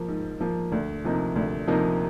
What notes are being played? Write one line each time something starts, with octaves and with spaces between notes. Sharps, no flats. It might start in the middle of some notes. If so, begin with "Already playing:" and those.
Already playing: F3 A#3
G#2
F3 A#3
D2
C3 F3 A#3 D#4
D2
C3 F3 A#3 D#4